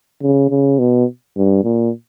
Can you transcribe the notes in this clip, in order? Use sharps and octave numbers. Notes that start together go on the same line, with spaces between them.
C#3
C#3
B2
G2
A#2